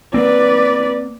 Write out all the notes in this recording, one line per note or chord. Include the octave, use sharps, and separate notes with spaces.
A#3 C4 B4 D5